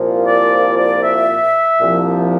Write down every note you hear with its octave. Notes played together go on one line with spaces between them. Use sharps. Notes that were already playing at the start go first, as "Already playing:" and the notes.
Already playing: C2 A#2 F3
D5
D5
E5
C2 A#2 F3